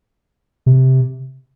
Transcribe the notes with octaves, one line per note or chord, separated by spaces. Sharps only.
C3